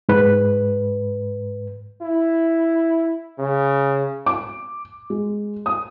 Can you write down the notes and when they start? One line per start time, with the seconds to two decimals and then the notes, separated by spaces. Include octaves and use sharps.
0.09 G#2 B4
2.01 E4
3.39 C#3
4.26 D6
5.10 G#3
5.66 D#6